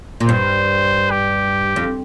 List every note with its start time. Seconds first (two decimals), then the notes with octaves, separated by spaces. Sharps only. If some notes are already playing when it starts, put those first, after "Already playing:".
0.20 A#2
0.28 G2 C5
1.11 G4
1.76 F2